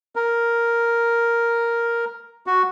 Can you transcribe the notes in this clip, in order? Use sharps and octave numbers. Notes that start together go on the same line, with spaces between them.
A#4
F#4